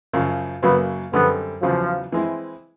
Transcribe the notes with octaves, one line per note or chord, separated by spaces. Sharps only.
F#2 C#3 F3
F#2 C#3 F#3 A#3 B3
F#2 D3 G3 B3 C4
E2 C#3 F3 F#3
E3 G#3 C4 E4